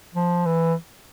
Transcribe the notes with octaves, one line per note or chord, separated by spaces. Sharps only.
F3
E3